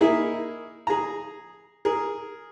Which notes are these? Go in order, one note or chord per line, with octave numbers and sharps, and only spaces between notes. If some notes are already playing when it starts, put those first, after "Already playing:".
A#3 D#4 E4 G#4
G#4 A#5
G#4 A#4